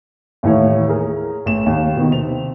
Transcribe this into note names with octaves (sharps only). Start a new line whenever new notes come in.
D#2 A2 E3 C#5
G#4 A#4
A1 E7
D#2
B2 D#3
C3 C4 F7